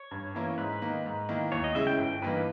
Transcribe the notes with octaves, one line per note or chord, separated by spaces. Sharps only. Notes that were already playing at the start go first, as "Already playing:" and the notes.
Already playing: C#5
G2
E3 A#3 C#4 E4
G#2 B4
D#3 A#3 D#4
G#2
D#3 A#3 E4
D#2 C#5
D#5
C#3 G#3 C#4 E4 E5
G5
G1 G5
G2 E3 A#3 D#4 B4